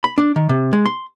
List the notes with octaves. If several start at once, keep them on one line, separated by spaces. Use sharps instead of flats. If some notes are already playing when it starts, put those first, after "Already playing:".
B5
D4
D#3
C3
G#3
C6